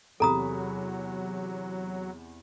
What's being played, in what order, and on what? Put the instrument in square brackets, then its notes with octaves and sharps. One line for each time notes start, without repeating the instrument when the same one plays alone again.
[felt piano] E2 C3 B5 [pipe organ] F#3 [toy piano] A4 A#5 D#6